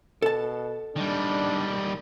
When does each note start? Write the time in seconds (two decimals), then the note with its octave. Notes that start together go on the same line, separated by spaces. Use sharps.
0.22 B2 A4 A5
0.96 D#3 G3 D4